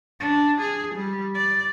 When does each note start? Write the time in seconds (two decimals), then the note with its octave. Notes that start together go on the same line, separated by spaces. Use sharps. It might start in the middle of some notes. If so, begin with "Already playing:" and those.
0.20 D4
0.61 G#4
0.95 G3
1.35 D5